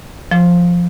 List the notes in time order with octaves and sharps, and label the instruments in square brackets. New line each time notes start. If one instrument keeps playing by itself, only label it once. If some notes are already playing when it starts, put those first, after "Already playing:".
[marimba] F3